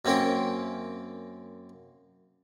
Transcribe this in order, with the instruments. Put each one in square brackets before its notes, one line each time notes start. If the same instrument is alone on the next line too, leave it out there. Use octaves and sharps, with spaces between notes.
[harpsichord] F#2 A#3 C4 C#4 A#4 G5